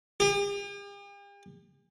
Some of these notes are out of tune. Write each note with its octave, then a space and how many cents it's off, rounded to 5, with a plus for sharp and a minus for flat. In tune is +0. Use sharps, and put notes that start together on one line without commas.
G4 +45